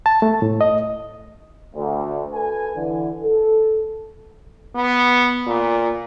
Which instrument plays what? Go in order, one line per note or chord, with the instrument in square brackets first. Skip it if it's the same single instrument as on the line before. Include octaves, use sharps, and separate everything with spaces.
[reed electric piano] A5
A3
A2
D#5
[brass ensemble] D2
A4 B4 G#5
D3 E3
A4
[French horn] B3
A#2